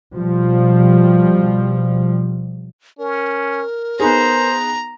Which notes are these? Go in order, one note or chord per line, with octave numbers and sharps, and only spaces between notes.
B2 F3 G3
C#4 A#4
B3 D#4 G#4 C5 A#5